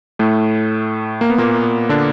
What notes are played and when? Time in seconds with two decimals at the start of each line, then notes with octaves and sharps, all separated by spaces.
0.19 A2 A3
1.21 A#3
1.30 B3
1.38 A#2 A#3
1.89 D3 D4